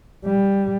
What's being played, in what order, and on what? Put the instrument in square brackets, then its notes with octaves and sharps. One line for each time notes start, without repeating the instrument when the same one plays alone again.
[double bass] G3